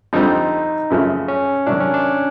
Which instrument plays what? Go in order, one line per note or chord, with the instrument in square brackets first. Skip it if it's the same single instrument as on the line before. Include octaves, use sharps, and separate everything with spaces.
[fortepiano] F2 D3 G3 C4 [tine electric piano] D#4
[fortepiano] F#2 C#3 F3 A3
[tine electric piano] C#4
[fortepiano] C3 D#3 F#3 [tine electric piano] D4
[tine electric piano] C#4
D4